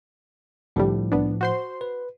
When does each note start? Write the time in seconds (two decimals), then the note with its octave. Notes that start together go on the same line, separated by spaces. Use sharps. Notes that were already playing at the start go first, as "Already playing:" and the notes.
0.76 C2 A2 D3 F3 G3
1.12 C2 B3 D4
1.41 F#4 C5 C6
1.81 B4